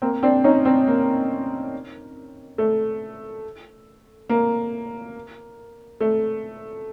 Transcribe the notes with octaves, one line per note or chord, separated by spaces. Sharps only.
A#3 C4
C4 D4
C#4 D#4
C4 D4
A#3
A3
A#3
A3